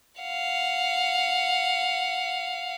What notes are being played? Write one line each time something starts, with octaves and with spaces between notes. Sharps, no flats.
F5 F#5